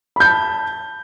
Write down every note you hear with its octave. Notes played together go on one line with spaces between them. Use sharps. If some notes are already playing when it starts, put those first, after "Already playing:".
A5 B5 G6